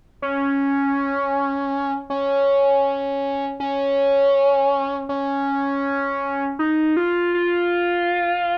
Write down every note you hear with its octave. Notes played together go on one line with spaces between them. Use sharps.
C#4
C#4
C#4
C#4
D#4
F4
F4